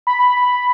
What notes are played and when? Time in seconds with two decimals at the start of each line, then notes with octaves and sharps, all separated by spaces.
0.07 B5